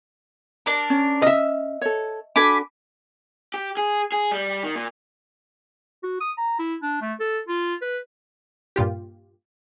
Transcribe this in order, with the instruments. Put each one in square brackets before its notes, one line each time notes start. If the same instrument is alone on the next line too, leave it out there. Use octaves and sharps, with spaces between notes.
[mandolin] D4 A#4
[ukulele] C#4
[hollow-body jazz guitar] D#5 E5 [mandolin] F6
[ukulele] A4 C#5
[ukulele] D4 F#4 A4 [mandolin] G#5 B5 D6
[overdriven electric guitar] G4
G#4
G#4
G3
D#3
A#2
[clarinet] F#4
D#6
A#5
E4
D4
A3
A4
F4
B4
[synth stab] G2 A#2 F4 G4